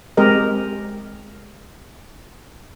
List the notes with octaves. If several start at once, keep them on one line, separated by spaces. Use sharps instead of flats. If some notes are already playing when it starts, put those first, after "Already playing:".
G#3 C4 G4 A#4 D#5